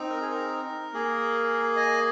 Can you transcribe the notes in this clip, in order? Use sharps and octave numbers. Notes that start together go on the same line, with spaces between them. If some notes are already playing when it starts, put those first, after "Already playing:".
Already playing: C4 D#4
A#4
G#4
A#4
A#3 G#4
D#5 G#5